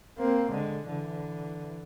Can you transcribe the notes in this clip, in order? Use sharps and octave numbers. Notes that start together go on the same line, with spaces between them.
A#3 C4
D3 G#3
D3 E3